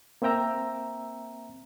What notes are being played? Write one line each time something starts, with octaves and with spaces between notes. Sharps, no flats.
A#3 C4 E5 G5 A#5 E6